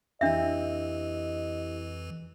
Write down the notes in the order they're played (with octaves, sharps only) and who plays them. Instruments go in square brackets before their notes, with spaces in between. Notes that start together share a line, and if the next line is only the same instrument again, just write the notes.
[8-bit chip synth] F2 E3 [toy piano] D4 E5 [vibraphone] E4 G4 [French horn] D#5